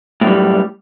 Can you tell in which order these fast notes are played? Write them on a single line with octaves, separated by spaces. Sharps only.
A2 F#2 G3